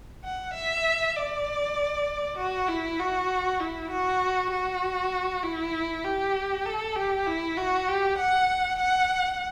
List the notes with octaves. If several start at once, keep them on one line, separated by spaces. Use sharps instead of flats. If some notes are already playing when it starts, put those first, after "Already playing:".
F#5
E5
D5
F#4
E4
F#4
E4
F#4
F#4
E4
G4
A4
G4
E4
F#4
G4
F#5
F#5